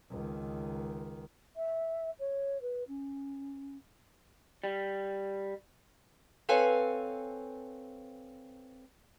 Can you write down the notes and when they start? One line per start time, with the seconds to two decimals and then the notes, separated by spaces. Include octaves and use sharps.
0.11 C#2 D#3
1.56 E5
2.19 C#5
2.61 B4
2.88 C#4
4.64 G3
6.49 C4 A4 B4 C#5 F5 G#5